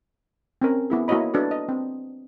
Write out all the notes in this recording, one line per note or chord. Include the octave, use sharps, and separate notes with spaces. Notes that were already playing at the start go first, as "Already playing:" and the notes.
C4 C#4 A#4
B3 E4 G#4
A#3 E4 F#4 C#5 D#5 B5
D4 F#4 A4 B4 D5
D#5
C4